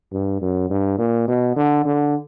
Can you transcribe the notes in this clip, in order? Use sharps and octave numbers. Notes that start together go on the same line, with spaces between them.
G2
F#2
G2
A#2
B2
D3
D3